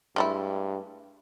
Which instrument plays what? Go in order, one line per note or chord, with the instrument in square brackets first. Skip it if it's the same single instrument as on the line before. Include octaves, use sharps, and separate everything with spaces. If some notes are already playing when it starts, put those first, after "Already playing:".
[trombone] G2 [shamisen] G#3 A3 E4